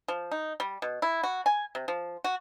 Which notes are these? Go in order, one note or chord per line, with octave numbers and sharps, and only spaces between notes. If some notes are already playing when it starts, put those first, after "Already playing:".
F3
D#4
G3
B2
E4
F#4
G#5
C3
F3
F#4